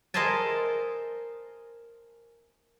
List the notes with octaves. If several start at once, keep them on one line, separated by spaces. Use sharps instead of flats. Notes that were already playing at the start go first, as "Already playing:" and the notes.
A#4 C5 D#5 E5 G#5 A5